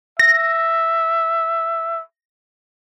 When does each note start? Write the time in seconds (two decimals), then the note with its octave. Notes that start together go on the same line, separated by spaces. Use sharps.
0.20 E5 A#6